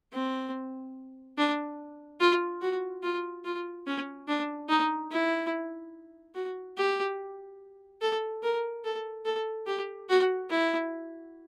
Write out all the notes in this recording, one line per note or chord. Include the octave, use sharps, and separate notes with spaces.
C4
D4
F4
F#4
F4
F4
C#4
D4
D#4
E4
F#4
G4
A4
A#4
A4
A4
G4
F#4
E4